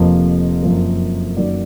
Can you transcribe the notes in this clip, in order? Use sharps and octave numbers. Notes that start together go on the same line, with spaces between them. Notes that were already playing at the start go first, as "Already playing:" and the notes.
Already playing: F1 F2 F3 A#3 D#5
F#2 F3 A#3
F#2 D#3 F#3 A#3 D5